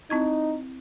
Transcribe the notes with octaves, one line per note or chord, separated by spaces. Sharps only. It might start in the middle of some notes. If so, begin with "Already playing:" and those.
C4 D#4 E4 G#6